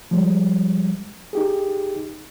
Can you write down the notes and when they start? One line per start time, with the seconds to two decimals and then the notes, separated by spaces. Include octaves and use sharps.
0.11 F3 G3 G#3
1.33 D#4 G4 G#4